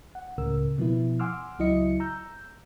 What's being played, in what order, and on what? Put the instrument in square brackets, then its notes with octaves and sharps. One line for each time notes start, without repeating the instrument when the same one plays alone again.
[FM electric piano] F#5
C#2 A2 C#3 A#4 E6
B2 F3 B3 E4
F#5 G#5 C6 D6 E6 F6
C#2 F#3 E4 D#5 C#7
A#5 E6 G6